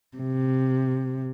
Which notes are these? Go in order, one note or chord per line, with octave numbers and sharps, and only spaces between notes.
C3